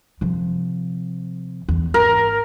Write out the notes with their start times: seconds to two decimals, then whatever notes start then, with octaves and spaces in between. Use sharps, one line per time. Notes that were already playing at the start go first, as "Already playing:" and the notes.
0.21 C3 F3
1.68 E2
1.94 G#1 A#4